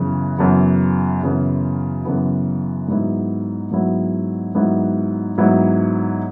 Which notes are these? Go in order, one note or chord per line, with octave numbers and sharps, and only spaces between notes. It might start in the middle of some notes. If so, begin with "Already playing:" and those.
Already playing: F#2 C#3 E3 B3
F#2 C#3 E3 B3
F#2 C#3 E3 B3
F#2 C#3 E3 B3
G#2 F#3 B3 E4
G#2 F#3 B3 E4
G#2 F#3 B3 E4
G#2 F#3 B3 E4